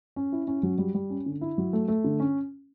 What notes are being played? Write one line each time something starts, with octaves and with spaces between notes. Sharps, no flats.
C#4
E4
C#4
F#3
G3
G3
C#4
D3
E4
F#3
A3
A3
D3
C#4